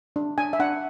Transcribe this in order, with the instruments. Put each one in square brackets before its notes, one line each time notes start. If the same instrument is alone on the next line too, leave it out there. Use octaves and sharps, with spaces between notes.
[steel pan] D4
D4 G#5
E5
D4 F#5